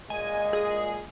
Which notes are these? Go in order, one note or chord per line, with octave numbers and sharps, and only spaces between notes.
A#2 G#3 D#5 G#5
G#4